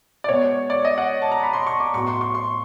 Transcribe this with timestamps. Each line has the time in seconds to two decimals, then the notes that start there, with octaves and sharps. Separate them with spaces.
0.24 D5
0.29 B2 G#3 B3 C#5
0.70 D5
0.85 D#5
0.98 F#5
1.22 A5
1.32 A#5
1.43 B5
1.53 C6
1.67 C#6
1.80 D6
1.94 A2 F#3 B3 C#6
2.07 C6
2.21 C#6
2.35 C6